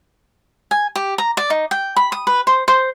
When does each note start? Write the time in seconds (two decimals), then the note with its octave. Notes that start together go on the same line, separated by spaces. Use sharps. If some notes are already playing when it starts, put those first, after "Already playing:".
0.71 G#5
0.96 G4
1.18 A#5
1.37 D5
1.50 D#4
1.71 G5
1.96 B5
2.12 D#6
2.27 B4
2.47 C5
2.68 C5